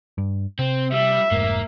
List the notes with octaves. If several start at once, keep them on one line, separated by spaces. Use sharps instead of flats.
G2
C3 C4
G3 E5
F1 G#2 A#3